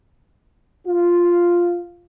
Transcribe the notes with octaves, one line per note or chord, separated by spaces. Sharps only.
F4